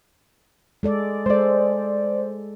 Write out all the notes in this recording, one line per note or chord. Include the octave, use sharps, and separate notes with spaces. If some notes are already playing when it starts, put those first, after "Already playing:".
G#3 A4 D5
G#3 A4 C5 D5